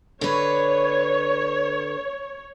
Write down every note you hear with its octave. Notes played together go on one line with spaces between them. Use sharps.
D3 B4 C#5